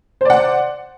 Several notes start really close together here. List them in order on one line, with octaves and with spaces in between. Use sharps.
C5 D5 F#5